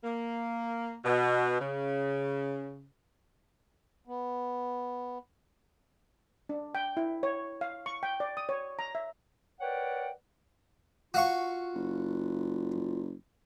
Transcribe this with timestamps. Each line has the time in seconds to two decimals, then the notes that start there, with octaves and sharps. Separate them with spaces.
0.04 A#3
1.05 B2
1.61 C#3
4.07 B3
6.49 D4
6.75 G5
6.97 E4
7.23 C#5
7.61 F5
7.86 C#6
8.03 G5
8.20 D5
8.37 D#6
8.49 C#5
8.79 A#5
8.95 E5
9.61 A#4 B4 C#5 D5 F#5 G5
11.14 F4 F#4 F5 C#6
11.74 F#1